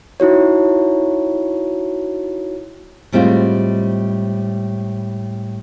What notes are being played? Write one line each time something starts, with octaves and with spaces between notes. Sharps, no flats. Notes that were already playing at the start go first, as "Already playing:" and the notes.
D#4 E4 F#4 C#5
A2 G3 G#3 C4 F4